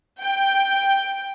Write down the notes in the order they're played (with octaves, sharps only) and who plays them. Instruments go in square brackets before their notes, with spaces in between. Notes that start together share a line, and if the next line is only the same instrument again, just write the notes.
[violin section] G5